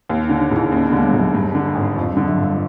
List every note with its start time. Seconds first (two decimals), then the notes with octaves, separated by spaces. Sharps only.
0.09 D#2
0.24 D#4
0.29 D3
0.40 D4
0.51 E1 E4
0.72 D#2 C#4
0.87 B3
0.93 D3 G#3
1.03 G3
1.13 E1
1.19 F#3
1.34 G2
1.55 D3
1.75 G#1
1.96 F2
2.12 D3 G3
2.28 F#3
2.38 G1
2.43 G3